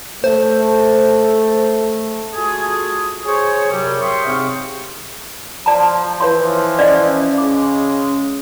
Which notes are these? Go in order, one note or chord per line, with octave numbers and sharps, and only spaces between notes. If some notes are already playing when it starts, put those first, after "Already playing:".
A3 C5
A3 F4 F#4 G#4
G#4 C5 C#5
F#2 C3 F#3 G3
C#5 E5 G5 C6 C#6 D#6
G#2 C3 C4 C5 F5 C#6
F3 D5 A5 A#5
E3 F3 B4 C#5 C6
C#4 D5 D#5 F5
C#3 G#3 D6